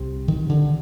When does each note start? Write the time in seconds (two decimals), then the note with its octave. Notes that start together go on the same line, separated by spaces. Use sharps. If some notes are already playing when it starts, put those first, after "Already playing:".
Already playing: C2 C3
0.28 D#3
0.49 D3